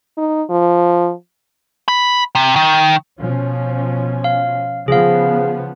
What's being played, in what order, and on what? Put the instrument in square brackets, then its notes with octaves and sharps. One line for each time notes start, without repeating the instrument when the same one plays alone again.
[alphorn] D#4
F3
[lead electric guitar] B5
C3
D#3
[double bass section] B2 F3 C#4
[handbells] F5
[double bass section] C#3 F3 B3 [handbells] G#4 F5